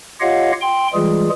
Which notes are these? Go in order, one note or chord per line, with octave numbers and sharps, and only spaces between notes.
F4 G4 C#5 D#5 F5 F#5
G5 C6
E3 G3 G#3 F4 G#4